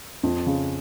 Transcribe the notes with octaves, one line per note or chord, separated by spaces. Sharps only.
F2
C#3